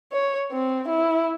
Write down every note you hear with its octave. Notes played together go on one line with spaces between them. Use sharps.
C#5
C4
E4